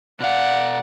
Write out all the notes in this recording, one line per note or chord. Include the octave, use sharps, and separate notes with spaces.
B2 D5 F5 F#5